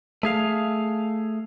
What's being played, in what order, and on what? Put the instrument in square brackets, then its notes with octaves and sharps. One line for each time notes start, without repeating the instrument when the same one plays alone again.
[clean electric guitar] A3 G#4 F5